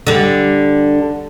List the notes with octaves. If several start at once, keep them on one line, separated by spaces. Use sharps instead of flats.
D3 G3